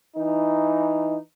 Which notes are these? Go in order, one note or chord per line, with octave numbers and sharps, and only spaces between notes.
E3 D#4